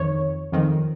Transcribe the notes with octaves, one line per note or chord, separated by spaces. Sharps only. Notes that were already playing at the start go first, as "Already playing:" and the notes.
Already playing: F2 D#3 C#5
F2 D#3